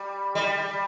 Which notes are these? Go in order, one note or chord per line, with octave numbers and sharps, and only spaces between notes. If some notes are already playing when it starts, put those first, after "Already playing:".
Already playing: G3
G3